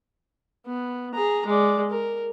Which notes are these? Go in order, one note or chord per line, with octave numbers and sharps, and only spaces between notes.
B3
G#4 A#5
G#3 D5
A#4